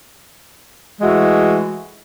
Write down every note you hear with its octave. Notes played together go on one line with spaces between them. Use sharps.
E3 G#3 A3 F#4